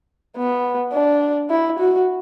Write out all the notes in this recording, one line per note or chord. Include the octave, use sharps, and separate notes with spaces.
B3
D4
E4
F#4